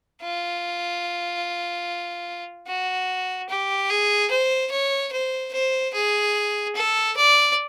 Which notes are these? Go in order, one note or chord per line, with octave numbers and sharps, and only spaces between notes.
F4
F#4
G4
G#4
C5
C#5
C5
C5
G#4
A4
D5